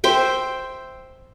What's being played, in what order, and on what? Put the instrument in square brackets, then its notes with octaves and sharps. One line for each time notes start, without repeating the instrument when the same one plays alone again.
[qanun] C5 E5 G5